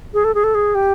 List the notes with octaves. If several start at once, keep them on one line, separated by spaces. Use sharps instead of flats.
G#4
A4
G#4
A4
G#4
G4